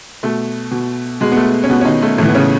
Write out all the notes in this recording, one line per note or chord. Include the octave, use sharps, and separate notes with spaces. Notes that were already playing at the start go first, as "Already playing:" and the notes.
B2 A3
B2
B2 G#3
B3
A3
C#4
B2 B3
C#4
D#3 D#4
A3
A2 E3 A3
B3
C#3 C#4